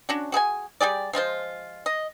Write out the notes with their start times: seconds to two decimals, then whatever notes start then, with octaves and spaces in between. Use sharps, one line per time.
0.09 C#4 D4 F#4
0.32 F#4 G#4 B4 G#5
0.81 G3 G4 G#4 D5
1.13 F3 G#3 F4 C5
1.86 D#5